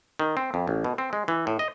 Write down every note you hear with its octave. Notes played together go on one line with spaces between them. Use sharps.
D#3
C4
F2
A1
B2
C4
G#3
E3
A2
D#5